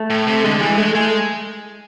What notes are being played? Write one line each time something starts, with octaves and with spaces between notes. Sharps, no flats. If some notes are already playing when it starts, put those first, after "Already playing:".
Already playing: A3
A2
C3
D3 G#3
E3 G#3
G#3 A3
G#3 A3